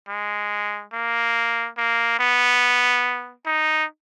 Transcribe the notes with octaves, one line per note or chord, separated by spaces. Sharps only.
G#3
A#3
A#3
B3
D#4